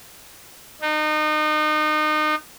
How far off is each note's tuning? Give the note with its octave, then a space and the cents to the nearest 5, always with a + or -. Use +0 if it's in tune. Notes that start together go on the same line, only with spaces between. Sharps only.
D#4 -30